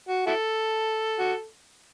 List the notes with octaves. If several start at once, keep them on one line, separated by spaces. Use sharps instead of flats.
F#4
E4 F#4 A4
F#4